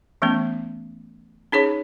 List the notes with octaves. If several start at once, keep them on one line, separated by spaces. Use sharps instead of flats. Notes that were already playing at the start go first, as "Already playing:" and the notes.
E3 A3 B3 C#4
C#4 D#4 G#4 C#5